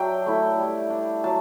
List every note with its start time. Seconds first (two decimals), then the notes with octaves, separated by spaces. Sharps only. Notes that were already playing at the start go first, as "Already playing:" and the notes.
Already playing: F#3 D4 E5 G5
0.26 A3 E4
0.58 G3
0.90 D4
1.24 F#3 A5